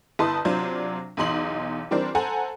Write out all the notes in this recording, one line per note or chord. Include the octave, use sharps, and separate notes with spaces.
G1 E4 B4 A5 C6 D#6
C3 F#3 D4 F4 C5
B1 E2 D#4 C6 F#7
E3 G3 C4 D4 A#4 C5
A4 C5 F#5 G#5 A#5